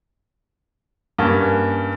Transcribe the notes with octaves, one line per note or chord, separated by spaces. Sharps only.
G2 A#3 C#4